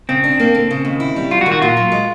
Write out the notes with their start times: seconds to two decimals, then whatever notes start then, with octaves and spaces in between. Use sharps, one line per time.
0.09 C#3 C4
0.24 D4
0.40 A#3
0.55 D3
0.70 C#3
0.85 D#2
1.00 E4
1.16 G3
1.31 F#3 F4
1.41 F#4
1.46 D#3
1.52 F#4
1.62 A#2 F4
1.77 F#3
1.92 G#3